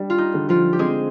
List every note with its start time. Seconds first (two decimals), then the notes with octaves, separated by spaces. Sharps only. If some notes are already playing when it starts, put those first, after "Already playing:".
Already playing: G3 D4
0.10 F4
0.18 D#4
0.34 D3
0.49 F3 F4
0.73 G4
0.79 G#3 C4 G#4